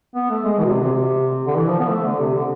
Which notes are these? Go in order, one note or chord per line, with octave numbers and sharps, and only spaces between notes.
B3
A3
G#3
E3
B2
C3
C3
C3
D3
E3
F3
B3
A3
D3
C3
D3